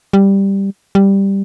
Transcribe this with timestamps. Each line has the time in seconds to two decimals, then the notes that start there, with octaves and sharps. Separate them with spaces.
0.13 G3
0.95 G3